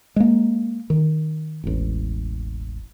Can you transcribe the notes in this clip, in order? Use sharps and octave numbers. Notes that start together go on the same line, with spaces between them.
G#3 A#3
D#3
E1 A1